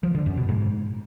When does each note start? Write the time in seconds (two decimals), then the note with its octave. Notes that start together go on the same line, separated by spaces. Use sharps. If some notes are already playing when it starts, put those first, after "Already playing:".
0.03 F3
0.15 D3
0.26 F#2
0.37 B2
0.49 G#2